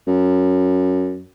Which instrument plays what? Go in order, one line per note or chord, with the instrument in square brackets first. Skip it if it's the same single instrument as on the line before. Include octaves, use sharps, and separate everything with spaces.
[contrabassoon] F#2